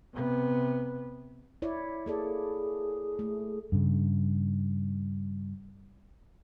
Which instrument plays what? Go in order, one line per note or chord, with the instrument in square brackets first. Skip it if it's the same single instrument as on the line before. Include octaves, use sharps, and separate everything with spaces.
[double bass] C3 B3
[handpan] E4 C#5 D5
[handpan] A#3 A4 D5 [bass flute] G#4
[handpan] A3
[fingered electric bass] G2 C#3